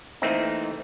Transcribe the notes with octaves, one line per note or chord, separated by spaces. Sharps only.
E3 A3 A#3 C4 D#4